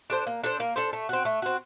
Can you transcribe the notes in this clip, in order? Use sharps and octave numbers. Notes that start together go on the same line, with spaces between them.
D4 A4 C5
A#3
D4 A4 C5
A#3
D4 A4 C5
A3
C4 F#4
A3
C4 F#4